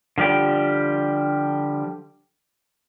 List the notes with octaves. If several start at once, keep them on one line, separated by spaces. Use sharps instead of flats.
D3 F3 G3 G4